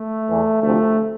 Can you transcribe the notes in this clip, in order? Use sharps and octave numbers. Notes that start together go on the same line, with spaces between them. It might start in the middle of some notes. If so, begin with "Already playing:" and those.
Already playing: A3
E2 E3
D2 C3 F3 A3